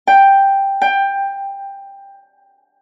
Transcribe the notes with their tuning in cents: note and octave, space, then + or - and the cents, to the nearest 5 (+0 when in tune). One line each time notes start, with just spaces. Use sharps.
G5 +5
G5 +15